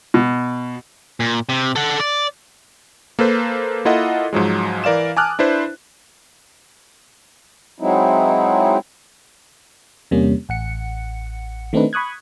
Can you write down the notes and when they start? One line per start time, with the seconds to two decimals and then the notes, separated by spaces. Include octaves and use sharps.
0.14 B2
1.20 A#2
1.49 C3
1.76 A4 F#5
2.00 D5
3.19 A#3 A4 B4 C5
3.85 A#3 E4 F4 A4 D#5 F#5
4.33 G#2 F3 F#3 G#3
4.84 E3 A#4 D5 F5 E7
5.17 G#5 A5 D6 D#6 F6 F#6
5.39 D4 E4 B4 C5
7.80 F#3 G#3 C4 D#4 E4
10.11 E2 C3 G3 A#3 C#4
10.49 A1 F#5 C#7
11.73 D#3 A3 C4 D4 D#4 B4
11.93 B5 C#6 D#6 F#6 G#6